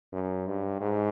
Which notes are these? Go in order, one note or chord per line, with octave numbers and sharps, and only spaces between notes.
F#2
G2
G#2